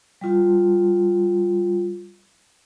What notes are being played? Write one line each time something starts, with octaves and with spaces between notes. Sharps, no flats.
G3 F4